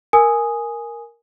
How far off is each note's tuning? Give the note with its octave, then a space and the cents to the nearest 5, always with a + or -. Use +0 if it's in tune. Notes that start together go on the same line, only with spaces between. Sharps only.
A#4 +0 G#5 +0 D#6 +0